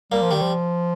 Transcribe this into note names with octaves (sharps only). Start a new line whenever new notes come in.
G3 A#3
F3
D#3 G3
F3